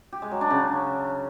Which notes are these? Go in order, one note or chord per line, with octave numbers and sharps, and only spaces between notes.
G4
G#3
F#3
D4
C#3